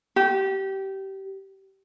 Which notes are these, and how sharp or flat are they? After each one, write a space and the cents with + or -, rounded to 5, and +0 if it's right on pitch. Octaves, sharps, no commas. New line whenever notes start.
G4 -20